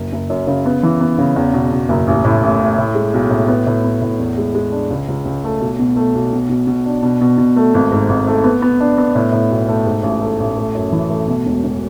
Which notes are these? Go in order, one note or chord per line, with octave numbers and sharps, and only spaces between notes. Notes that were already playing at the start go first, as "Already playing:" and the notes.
Already playing: F#1
F#1
F#2
C#3
B3
E3
B3
C#3
E2
B2
B2
F#1
A1
A2
A1
A1
A2
G#3
B1
A2
B3
A2
B3
A2
E2
G#3
G#3
D4
C#2
C#2
C#2
A3
B1
B2
A3
B1
B2
B2
B2
D4
B2
B2
B2
A3
G#1
G#2
G#1
A3
B3
B3
D4
B3
A2
A2
B1
A3
G#2
A1
A3
A1
A3
F#2
E3
A3
B2
E1
E1